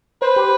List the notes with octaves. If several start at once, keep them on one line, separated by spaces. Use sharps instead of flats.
B4 C5
G4